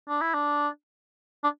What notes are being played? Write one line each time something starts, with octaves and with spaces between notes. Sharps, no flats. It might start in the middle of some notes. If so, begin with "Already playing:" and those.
D4
E4
D4
D4